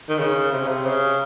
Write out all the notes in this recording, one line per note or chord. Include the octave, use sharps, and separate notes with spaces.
D#3
C#3
C3
C#3
C3
C#3